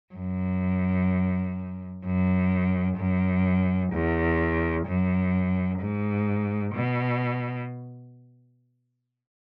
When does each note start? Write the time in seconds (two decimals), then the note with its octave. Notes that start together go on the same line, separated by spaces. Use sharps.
0.13 F#2
2.03 F#2
2.96 F#2
3.90 E2
4.85 F#2
5.79 G#2
6.73 B2